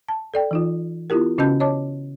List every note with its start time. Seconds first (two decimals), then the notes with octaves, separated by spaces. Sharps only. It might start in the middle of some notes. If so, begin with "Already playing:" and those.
0.09 A5
0.34 A4 D5 G5
0.51 E3 D#4 F4
1.10 B3 E4 F4 G4 A#4
1.38 C#3 C#4 F#4 D#5 A5 G6
1.60 C#5 D#5 A5 D6